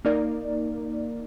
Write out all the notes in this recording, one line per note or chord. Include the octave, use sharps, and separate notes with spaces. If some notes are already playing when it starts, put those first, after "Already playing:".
A#3 D#4 A#4 D5